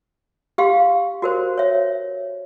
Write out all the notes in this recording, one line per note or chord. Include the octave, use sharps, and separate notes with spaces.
G4 F5 C6
F#4 A#4 C5
C#5 E5